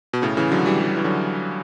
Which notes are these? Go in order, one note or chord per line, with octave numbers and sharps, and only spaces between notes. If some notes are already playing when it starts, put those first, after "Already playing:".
B2
A2 C#3
C#3 E3
D3 F#3
E3 G3
G3
F#3
E3
D3 F#3